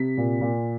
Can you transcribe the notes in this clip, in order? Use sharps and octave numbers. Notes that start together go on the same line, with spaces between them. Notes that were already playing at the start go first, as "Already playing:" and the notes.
Already playing: C3 B6
A#2
A#2